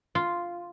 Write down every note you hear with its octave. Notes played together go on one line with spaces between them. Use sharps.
F4